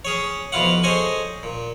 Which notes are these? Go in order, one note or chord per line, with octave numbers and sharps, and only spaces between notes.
C#4 G#4 C#5
F2 B2 E4 F4 F5 F#5
G#4 A4 C5 C#5 D#5 G#5
A#2